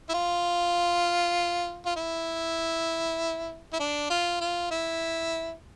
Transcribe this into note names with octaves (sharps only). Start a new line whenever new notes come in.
E4
F4
F4
E4
E4
D4
F4
F4
E4